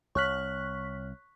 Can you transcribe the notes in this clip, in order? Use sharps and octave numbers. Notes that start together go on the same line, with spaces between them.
C2 C#5 C#6 F6 F#6 B6 F#7